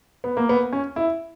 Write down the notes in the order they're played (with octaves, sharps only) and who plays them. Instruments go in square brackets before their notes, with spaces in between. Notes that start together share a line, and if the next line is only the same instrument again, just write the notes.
[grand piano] B3
A#3
B3
C#4
E4